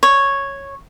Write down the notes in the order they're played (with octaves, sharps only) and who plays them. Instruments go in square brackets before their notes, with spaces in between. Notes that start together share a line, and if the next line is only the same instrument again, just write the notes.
[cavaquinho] C#5